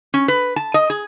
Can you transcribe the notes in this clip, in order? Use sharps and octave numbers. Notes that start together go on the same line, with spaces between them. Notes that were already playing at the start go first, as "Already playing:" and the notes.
C#4
B4
A5
D#5
G#4